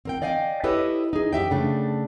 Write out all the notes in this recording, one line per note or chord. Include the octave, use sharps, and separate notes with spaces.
C4 A#4 G5
D5 D#5 F5 G5 G#5
E4 G4 A4 B4 C#5 D#5
D#4 G#4
F#2 G4 E5 G5
C#3 A3 D4